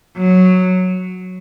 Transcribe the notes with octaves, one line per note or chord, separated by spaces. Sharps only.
F#3